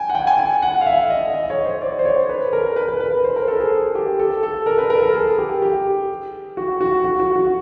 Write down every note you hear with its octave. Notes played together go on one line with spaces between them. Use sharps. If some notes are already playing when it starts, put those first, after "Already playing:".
Already playing: G5 G#5
F#5
G5
G#5
G#5
F#5
F5
E5
D#5
D#5
C#5
C5
D5
C5
C#5
B4
A#4
B4
B4
B4
C5
A#4
A4
G#4
G4
A4
A4
A#4
B4
A#4
A4
G#4
G4
G4
F#4
F#4
F#4
F#4
F#4